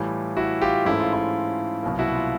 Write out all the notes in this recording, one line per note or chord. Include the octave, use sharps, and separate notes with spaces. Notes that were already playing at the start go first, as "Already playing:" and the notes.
Already playing: A2 E3 G3 F4
E4 F#4
F4 G4
G#2 E3 A3 C#4 E4
F4
E4
C2 B2 F#3 A#3
E4 F#4
F4